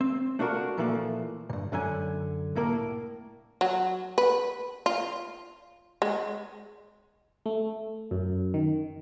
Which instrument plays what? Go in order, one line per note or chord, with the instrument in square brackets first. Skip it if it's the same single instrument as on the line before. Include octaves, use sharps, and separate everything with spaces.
[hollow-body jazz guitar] C4
A3 D4 F4 F#4 A#4
A#2 E3 F3 A3 A#3
G2 A#2
F#2 D3 F#3 G#5
C2 A2 A#3 A#4
[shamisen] F#3
B4
F4
G#3
[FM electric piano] A3
F#2
D#3